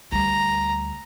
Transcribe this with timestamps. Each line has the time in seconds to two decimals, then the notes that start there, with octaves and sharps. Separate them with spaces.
0.12 D2 G3 A#5